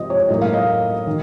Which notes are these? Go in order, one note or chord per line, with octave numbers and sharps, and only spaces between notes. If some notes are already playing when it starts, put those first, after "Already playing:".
Already playing: C3 F3 C4 D#5
C#5
A2 F#3 A#3 D#5
F5
D#5
D#3